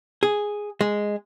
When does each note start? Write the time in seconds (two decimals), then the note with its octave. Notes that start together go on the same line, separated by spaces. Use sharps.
0.23 G#4
0.81 G#3